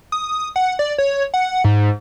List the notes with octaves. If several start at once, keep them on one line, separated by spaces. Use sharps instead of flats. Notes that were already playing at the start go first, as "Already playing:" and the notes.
D#6
F#5
D5
C#5
F#5
G#2